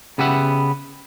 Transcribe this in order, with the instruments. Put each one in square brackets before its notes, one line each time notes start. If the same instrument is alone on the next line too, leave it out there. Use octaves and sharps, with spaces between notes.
[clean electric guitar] C#3 B3 G4 B4 E5 F#5